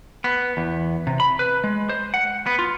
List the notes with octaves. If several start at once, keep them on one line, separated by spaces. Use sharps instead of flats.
B3
E2
C3
B5
B4
G#3
C5
F#5
B3
F4